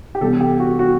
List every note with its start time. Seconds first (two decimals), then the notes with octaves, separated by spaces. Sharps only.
0.15 G4
0.21 C3 E3 G3 B3 A4
0.40 G4
0.60 F#4
0.79 F#4